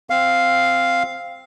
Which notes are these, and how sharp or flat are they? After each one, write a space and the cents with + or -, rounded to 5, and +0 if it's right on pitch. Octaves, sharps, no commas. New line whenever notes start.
C4 +0 F5 +0